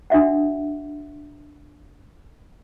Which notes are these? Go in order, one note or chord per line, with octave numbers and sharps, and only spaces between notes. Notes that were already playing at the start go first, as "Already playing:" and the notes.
D4 F#4 E5 F#5